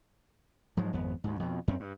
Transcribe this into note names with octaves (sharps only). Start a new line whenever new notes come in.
G#2 F3 F#3 G#3
G#1 F2 B3
D2 G#2
F2 B2
F#2 C4 C#4
G2